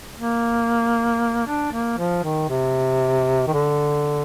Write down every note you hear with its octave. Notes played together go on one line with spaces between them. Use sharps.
A#3
D4
A#3
F3
D#3
C3
D#3
D3